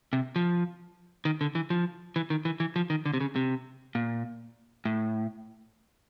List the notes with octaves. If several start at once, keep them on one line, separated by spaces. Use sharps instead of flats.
C3
F3
D#3
D3
E3
F3
E3
D#3
E3
E3
F3
D#3
D3
C3
C#3
C3
A#2
A2